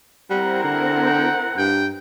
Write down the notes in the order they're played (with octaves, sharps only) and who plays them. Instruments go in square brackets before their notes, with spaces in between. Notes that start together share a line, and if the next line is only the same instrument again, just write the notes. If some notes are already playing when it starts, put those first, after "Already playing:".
[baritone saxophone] G3 [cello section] C4 E4 A#4 [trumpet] F#5
[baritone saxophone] D3 [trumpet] F#5
[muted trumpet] G5
[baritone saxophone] G2 [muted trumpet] G5